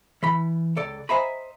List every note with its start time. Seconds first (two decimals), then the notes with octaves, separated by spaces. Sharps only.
0.23 E3 B5
0.77 C#2 A4 D5
1.09 C5 D#5 E5 G#5 A#5 B5